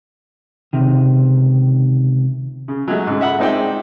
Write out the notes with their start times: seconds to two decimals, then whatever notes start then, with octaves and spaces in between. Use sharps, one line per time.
0.73 C#2 C3 D#3
2.68 C#3
2.88 F#3 G#3 A3
3.07 G#2 C#3
3.21 E5 F#5 B5
3.39 G#3 C4 D#4 D5 E5 G5